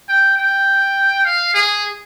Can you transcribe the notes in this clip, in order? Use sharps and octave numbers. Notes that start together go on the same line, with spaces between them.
G5
G5
F5
G#4